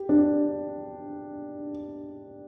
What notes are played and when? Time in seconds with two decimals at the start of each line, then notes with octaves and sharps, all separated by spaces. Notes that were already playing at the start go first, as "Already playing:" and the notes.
Already playing: G4
0.09 D4